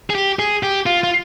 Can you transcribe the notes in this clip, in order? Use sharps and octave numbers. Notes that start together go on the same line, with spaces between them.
G#4
G4
G#4
G4
F4
F4